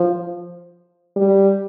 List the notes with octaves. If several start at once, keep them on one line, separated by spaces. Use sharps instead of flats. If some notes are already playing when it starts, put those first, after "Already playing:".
Already playing: F3
G3